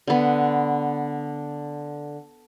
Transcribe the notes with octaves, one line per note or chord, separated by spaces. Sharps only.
D3 B3